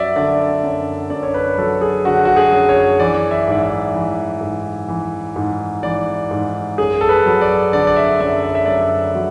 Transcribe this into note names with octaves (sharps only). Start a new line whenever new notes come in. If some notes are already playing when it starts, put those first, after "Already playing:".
Already playing: F#2 F#3 D5 E5
D3 D5
F#2
F#2 D5
C#5
B4
F#3 A4
G#4
D3 F#4
F#4
G#4
F#2
C#5
E3 D5
E5
G#2 D5
E5
E3
G#2
E3
G#2
E3 D5
G#2
F#2 G#4
A4
B4
F#3
D5
D3 D5
D5
E5
F#2 E5
D5
E5
F#2 D5
F#3